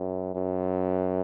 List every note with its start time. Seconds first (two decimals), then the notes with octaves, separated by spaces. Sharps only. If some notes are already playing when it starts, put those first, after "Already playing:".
Already playing: F#2
0.35 F#2